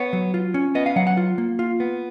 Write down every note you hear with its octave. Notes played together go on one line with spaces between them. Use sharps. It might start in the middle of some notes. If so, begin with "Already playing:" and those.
Already playing: B3 C#5
F#3
F4
C#4
B3 D#5
F5
F#3 F#5
F#5
F4
A#3
F4
B3